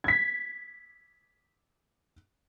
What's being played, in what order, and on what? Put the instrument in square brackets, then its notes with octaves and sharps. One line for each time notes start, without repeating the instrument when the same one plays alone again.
[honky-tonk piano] G#6 B6